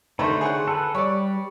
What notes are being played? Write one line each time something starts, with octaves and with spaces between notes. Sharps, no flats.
D3 D#3 A3 B4 C5
G#4 C#5 F#5
A4 B4
G3 C#5 D5